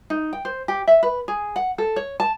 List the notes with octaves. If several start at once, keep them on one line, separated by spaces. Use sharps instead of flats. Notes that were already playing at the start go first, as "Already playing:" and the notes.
D#4
G5
C5
G4
E5
B4
G#4
F#5
A4
C#5
A5